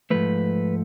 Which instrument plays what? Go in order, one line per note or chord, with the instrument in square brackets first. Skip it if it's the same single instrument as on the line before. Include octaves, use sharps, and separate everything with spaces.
[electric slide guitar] G#2 F3 A3 B4